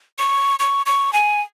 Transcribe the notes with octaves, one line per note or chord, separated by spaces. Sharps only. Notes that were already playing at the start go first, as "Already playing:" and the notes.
C#6
C#6
C#6
G#5